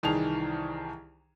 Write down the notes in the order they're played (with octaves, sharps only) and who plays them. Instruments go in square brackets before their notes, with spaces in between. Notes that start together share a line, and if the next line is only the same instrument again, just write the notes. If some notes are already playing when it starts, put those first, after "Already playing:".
[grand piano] C2 D#3 E3 G#4 A5 F7